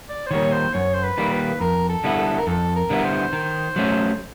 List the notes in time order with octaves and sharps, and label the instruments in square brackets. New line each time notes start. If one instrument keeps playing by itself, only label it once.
[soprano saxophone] D5
C5
[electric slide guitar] D#3 G3 A#3 [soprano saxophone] C#5
[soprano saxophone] C5
[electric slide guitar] F#2 [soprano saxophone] C#5
[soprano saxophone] C5
B4
[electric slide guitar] D#3 G3 A#3
[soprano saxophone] B4
[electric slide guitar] F2 [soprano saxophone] A#4
[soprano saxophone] A4
[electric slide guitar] D3 G3 B3 E4
[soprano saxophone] A4
A#4
[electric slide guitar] F2 [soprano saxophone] A4
[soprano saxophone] A#4
[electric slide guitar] D3 G3 B3 E4
[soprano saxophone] C5
[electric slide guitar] D#3
F#3 A3 C#4